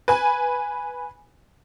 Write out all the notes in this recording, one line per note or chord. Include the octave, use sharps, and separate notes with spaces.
B4 G#5